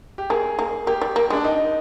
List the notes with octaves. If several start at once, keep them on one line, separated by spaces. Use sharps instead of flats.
G4
A#3 G#4
A#3
A#3 G4
G3
A#3
G#3
D4
D#4